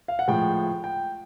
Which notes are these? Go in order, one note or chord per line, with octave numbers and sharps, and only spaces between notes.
F5
F#5
A2 F3 G#3 G5
G5